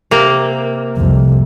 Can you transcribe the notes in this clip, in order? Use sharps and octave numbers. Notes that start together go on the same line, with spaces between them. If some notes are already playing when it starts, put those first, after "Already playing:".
C3 A#3
C2 F2